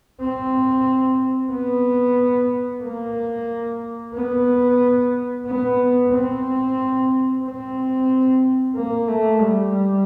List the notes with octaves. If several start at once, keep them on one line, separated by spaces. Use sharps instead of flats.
C4
B3
A#3
B3
B3
C4
C4
A#3
A3
G3